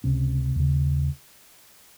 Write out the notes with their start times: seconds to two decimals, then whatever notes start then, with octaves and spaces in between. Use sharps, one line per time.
0.04 C#2 C3 C#4
0.56 D#2 C#3